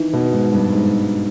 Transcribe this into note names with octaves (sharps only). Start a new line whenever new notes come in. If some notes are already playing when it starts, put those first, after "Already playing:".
Already playing: D#3 E3
B2
G#2
G2
G#2